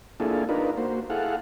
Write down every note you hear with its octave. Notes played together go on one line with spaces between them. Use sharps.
A#3 D4 E4 F4 G#4 A4
D4 D#4 F4 A#4 B4
A#3 F#4 C5
E4 G#4 A4 F5 F#5